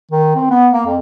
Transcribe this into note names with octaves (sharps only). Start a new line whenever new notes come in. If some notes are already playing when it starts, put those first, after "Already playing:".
D#3
C4
B3
A#3
F2